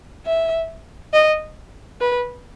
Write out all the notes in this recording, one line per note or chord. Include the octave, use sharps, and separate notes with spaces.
E5
D#5
B4